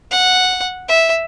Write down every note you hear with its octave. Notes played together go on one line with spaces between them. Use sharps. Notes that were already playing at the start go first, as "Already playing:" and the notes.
F#5
E5